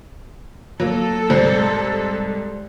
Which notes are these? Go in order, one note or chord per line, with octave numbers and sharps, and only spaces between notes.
F#3 A#3 A4
C2 G#2 C5 D5